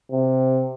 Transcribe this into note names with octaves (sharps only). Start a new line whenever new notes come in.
C3